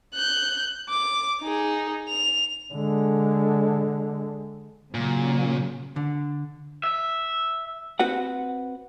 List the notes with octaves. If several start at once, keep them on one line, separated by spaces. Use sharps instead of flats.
F#6 G6
D6
D#4 G#4
F7
D3 G#3
A#2 C#3 F#3
D3
E5
C4 F#4 B4 F#5